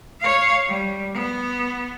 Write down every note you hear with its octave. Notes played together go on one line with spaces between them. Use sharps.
C#5 F5
G3
B3